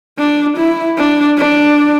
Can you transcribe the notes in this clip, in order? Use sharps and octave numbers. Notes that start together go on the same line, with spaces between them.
D4
E4
D4
D4